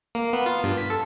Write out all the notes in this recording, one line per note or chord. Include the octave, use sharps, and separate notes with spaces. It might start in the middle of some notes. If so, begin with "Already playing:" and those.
A#3
B3
F4
G2
B6
A4